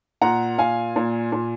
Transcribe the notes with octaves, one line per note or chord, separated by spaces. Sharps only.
A#2 F#5 A#5
A#2 F5 G#5
A#2
A#2